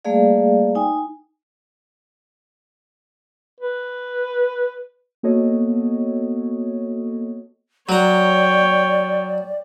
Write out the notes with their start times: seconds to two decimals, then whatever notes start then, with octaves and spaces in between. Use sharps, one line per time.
0.05 G3 A3 A#3 G#4 D5 F5
0.75 D#4 G5 G#5
3.60 B4
5.23 A#3 B3 F#4 A4 C#5 D#5
7.89 F#3 C#5 D5 G5 A#5